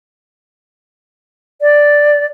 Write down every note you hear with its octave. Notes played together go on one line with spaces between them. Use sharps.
D5